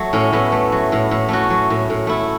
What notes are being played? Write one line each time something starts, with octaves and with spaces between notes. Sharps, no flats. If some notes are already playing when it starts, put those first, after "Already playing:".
Already playing: F#3 A3
A2 C#4
A2 B3 E4
A3
F#3
A2
A2
A3 C#4 F#4
F#3
A2
A2
A3 E4 A4